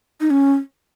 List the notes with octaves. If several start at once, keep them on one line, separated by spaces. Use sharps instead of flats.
D#4
C#4